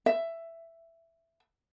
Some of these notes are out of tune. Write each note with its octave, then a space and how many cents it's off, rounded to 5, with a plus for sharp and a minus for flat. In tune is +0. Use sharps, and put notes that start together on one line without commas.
E5 +10